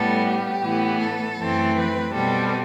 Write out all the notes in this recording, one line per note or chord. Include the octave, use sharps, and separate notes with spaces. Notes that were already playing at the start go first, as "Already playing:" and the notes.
Already playing: A2 G3 B3 A4
G4
A2 E3 B3
A4
F#2 E3 A3 C4
B4
B2 G3 C4 A4